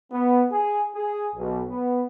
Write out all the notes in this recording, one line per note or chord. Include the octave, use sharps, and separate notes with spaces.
B3
G#4
G#4
B1
B3